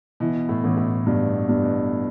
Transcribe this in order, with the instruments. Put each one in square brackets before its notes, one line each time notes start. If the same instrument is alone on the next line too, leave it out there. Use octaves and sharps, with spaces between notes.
[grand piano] B2 [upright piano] E3
[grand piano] A2
[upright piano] A1
[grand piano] A2
[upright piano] G2 [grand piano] B2
[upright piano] G2
[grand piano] B2